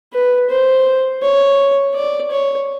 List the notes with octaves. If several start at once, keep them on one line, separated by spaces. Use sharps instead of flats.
B4
C5
C#5
D5
C#5